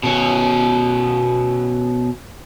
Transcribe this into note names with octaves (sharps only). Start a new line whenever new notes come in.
B2 C#4